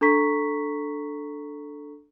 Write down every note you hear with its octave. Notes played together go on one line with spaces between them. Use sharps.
D4 A4 A#5 C#6 B6